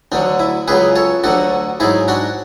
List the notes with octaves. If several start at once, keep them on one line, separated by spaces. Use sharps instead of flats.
D2 D3 F#3 D4
E4
C#2 C#3 F#3 G#4 B4
A4 C#5
D2 D3 F#3 F#4 A4
G#2 F#3 E4 G#4
D4 F#4